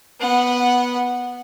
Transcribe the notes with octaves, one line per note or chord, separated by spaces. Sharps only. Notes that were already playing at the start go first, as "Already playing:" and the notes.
B3 F#5